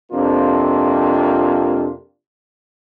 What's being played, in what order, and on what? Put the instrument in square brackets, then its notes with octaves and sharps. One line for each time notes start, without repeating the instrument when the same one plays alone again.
[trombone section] F2 C3 A#3 D4 F4